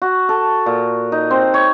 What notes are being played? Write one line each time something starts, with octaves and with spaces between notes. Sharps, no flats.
F#4
A4
A#2
D#4
C4
C#5